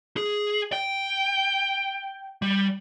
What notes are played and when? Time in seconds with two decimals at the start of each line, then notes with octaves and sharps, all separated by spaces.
0.17 G#4
0.73 G5
2.42 G3